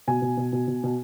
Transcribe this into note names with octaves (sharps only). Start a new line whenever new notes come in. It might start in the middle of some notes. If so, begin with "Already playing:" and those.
B2 G#5
B2
B2
B2
B2
B2